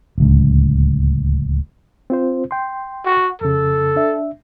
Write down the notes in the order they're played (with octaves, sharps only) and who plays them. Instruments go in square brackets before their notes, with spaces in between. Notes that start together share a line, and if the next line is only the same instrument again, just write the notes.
[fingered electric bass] D1 C#2
[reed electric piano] C4 F4 C5
G5 C6
[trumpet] F#4
[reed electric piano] F2 C#3 [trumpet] A4
[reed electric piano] D4 E5